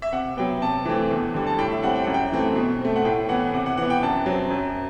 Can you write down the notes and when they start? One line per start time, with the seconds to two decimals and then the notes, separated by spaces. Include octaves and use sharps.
0.02 E5
0.13 C3 F#5
0.37 F#3 B3 G5
0.62 C3 A5
0.85 E3 A3 C4
1.11 E2
1.34 D3 G3
1.47 A5
1.59 A2 G5
1.71 E5
1.83 G3 C4 F#5
1.96 G5
2.04 F#2 F#5
2.14 G5
2.32 E3 A3 C4
2.56 B2
2.81 A3 C4
2.96 F#5
3.05 A2 G5
3.29 E3 B3 F#5
3.53 C3 F#5
3.66 F#5
3.77 E3 B3 F#5
3.90 G5
4.03 F#2 A5
4.26 F#3 C4
4.50 F#2